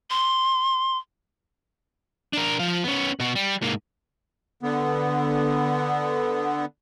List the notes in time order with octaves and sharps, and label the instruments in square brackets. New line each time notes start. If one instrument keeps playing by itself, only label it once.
[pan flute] C6
[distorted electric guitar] D4 A#4
F3 F5
B3 C#4
B2 F#4
G3
G#2 A#3
[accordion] D3 B3